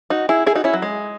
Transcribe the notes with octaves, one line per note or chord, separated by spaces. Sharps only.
D#4 F#4
E4 G#4
E4 G#4
D#4 F#4
C#4 E4
F#3
G#3